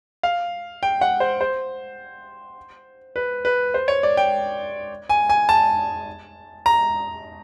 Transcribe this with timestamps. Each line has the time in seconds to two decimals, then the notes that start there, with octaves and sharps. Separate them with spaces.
0.23 F5
0.83 G5
1.01 F#5
1.20 C5
1.41 C5
3.16 B4
3.45 B4
3.74 C5
3.88 C#5
4.03 D5
4.17 G5
5.09 G#5
5.29 G#5
5.49 A5
6.66 A#5